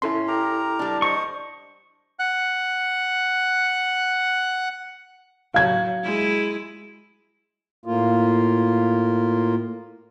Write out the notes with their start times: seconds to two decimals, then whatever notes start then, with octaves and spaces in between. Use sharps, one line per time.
0.02 C#4 E4 A4 C6
0.28 G4 A#4 A#5
0.79 G3 D4
1.02 C5 D#5 C#6
2.19 F#5 F#6
5.54 F#3 F5 G#6
6.03 G#3 E4
7.86 A2 A#3 F4